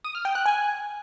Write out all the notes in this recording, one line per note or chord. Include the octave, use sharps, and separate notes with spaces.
D#6
F6
G5
F#6
G#5